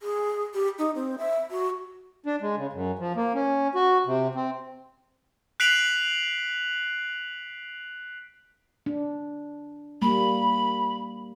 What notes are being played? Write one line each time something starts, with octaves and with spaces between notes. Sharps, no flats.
G#4
G4
D#4
C4
E5
F#4
D4
G#3
C#3
F#2
F3
A#3
C#4
F#4
C3
C4
F#6 B6 C7 D7 F7 F#7
D4
G3 A#3 B5